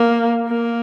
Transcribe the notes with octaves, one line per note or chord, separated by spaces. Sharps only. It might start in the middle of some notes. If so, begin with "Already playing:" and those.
Already playing: A#3
A#3